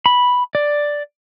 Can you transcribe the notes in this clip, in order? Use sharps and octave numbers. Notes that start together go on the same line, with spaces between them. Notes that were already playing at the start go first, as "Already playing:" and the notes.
B5
D5